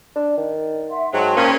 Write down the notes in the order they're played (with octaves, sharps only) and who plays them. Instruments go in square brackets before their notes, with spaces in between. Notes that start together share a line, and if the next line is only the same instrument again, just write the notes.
[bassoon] D4
[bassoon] D#3 [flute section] D5
[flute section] E5 F#5 C6
[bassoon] G#2 [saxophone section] F#3 [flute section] G5 A5 C6
[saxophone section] A#2 C#4 [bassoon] A#3